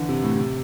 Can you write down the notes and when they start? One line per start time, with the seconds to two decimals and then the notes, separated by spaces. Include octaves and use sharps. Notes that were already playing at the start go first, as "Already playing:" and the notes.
Already playing: D3 E3
0.09 C3
0.23 A2
0.37 C3